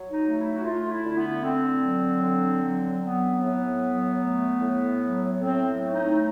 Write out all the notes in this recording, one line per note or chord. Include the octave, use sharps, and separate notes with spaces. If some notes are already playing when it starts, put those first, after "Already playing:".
Already playing: F#3
D#4
A3
E4
F#4
A3 F4
E4
D3
B3
D3 C4
F#3
D3
F#3
F#3 B3
A2
F#3
A3
A2
F#3
A2 C4
A3
D#4